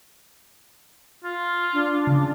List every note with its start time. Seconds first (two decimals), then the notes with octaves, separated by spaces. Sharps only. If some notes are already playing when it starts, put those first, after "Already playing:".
1.24 F4
1.73 D4
2.07 C#3